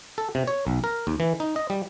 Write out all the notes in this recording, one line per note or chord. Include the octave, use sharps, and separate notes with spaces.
A4
C3
C#5
B1
A#4
D#2
E3
D#4
D#5
G3